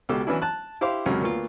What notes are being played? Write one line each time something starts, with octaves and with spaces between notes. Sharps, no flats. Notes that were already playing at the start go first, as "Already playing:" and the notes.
C#2 B2 G4 A4 E6
E3 F#3 B3 C#4 D4 E4
A5 F#6
E4 G4 C5 F5 C6 D6
C#2 F#2 C3 F#3
D2 A#3 B3 F4